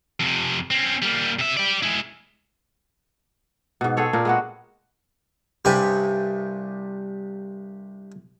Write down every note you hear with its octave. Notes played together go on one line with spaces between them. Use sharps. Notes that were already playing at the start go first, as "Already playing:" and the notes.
F2 C3
C4 C#4
G3 A#3
C3 E5
G4 D5
G#3 E4
G#2 B2
C4 G#4 A4 C#5
A#2 C4 D4 A#4
G#3 B3 F#4
C2 G2 C3 G4 G#5 B5